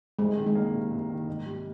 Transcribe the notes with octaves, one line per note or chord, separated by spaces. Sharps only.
C2 G#3
D#3
G#3
A#3
C3
C2
D#3
G#2
G3